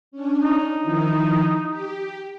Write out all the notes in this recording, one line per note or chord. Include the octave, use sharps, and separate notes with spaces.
C#4 D4
D#4
D#3 F3 E4
G4